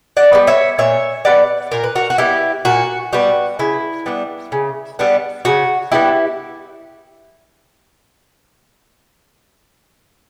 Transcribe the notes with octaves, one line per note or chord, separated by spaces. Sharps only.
D5 F#5
G3 B3
C#5 E5
A#2 C#5 E5
G3 B3 D5 F#5
A#2 A#4
B4
F#4 A#4
F#4
G3 B3 E4 G4
A#2 F#4
G3 B3 F#4
C#3 E4
G3 B3 D4
C#3
G3 B3 D4
C#3 F#4
G3 B3 D4 E4 G4